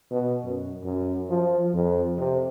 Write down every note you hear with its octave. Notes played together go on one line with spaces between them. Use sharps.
B2
F#2
F#2
F3
F2
C3